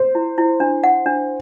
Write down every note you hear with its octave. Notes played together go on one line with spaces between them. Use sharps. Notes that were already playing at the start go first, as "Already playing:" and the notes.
Already playing: C5
E4
E4
D4
F#5
D4